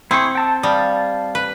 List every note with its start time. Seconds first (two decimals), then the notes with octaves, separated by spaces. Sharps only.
0.11 C4 E4 G#4 C#6
0.35 G5 A5 E6
0.63 G3 F5 A5 D#6
1.35 B4